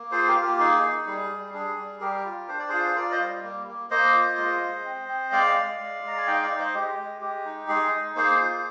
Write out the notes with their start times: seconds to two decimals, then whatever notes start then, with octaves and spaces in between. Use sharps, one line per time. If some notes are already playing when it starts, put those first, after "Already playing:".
Already playing: A#3
0.12 F4 G#4 C5
0.28 G4 A#4
0.35 A#3
0.43 G4
0.59 D#4 G#4
0.83 D#4
1.06 G3 G#4
1.30 G3
1.54 D4 G#4
1.77 G3
2.01 G3 G4 A#4
2.25 F4
2.48 D4 C5
2.59 D5
2.69 F4 G#4 C5
2.88 C5
2.96 F4 A#4 D5
3.11 C5 D#5
3.20 G3
3.43 A#3
3.67 A#3
3.90 A#3 C5 D#5
4.14 F4
4.38 G#3
4.62 G#3
4.85 C4
5.09 C4
5.32 G#3 D5 F5
5.56 G#3
5.80 G#3
6.03 G#3 A#5
6.17 G#5
6.27 D#4 D#5 G5
6.43 D5 F5
6.50 D#4
6.59 C5 D#5
6.74 G#3 G4
6.98 G#3
7.21 G#3 G4
7.45 D#4
7.68 G#3 G#4
7.92 D#4
8.16 A#3 G#4 C5
8.40 F4